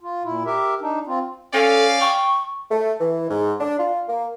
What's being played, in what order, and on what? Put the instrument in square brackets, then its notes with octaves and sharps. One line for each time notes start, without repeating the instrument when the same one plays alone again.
[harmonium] F4
A#2 E4
G4 A#4 E5
D4 D#4
C4 F4
[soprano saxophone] C#4 [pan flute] A4 [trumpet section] D5 F5
[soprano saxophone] G5 [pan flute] C#6
[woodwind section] A3
E3
G#2
D4
F4
A#3